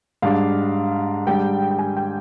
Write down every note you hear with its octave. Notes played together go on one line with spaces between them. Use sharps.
G#2 G3 D4 F5
G#2 G3 D4 G5
G5
G#5
G5